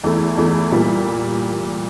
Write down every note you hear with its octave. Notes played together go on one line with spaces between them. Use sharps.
E2 E3 A3 E4
E2 E3 A3 E4
A#2 G3 A#3